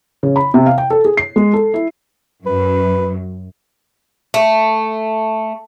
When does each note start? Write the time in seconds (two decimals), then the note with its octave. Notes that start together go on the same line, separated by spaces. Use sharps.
0.23 C#3
0.36 B5
0.54 C3
0.66 F5
0.78 G5
0.90 A4
1.05 G#4
1.17 C7
1.36 G#3
1.53 A4
1.74 E4
2.46 F#2 B4
4.34 A3